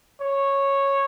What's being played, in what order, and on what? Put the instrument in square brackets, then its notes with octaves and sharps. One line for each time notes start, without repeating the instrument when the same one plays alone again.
[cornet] C#5